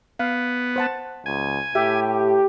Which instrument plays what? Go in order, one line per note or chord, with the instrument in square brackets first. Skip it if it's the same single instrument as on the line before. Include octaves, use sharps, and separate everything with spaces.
[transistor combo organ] B3 [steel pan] F5
[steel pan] C5 F#5 A5
[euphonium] C#2 [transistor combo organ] G#5
[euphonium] A2 [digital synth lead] G4 [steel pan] E5